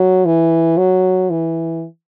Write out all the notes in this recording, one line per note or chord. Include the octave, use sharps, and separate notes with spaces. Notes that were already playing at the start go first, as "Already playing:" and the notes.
Already playing: F#3
E3
F#3
E3